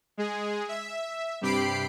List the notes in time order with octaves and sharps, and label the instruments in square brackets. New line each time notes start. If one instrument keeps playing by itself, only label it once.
[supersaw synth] G#3 G#4
E5
G2 C3 G4 B5 C7 D7